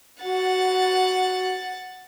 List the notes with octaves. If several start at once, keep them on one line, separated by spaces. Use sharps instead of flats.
F#4 F#5 A6